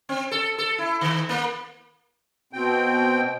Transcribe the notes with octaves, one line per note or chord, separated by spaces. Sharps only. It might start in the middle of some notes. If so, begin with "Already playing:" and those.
C4
A4
A4
E4
D#3
A#3
B2 C4 G5